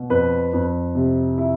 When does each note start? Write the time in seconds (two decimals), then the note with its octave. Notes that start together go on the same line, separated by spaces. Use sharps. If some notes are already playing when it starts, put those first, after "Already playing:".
Already playing: B2
0.10 F2 B4
0.53 F2
0.95 C3
1.38 E4